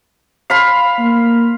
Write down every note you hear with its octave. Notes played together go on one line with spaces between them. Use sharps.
F5 B5 C6
A#3